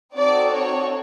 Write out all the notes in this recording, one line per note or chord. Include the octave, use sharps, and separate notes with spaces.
C4 D#4 F#4 A4 D5
C#5